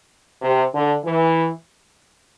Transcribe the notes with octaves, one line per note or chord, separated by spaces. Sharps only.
C3
D3
E3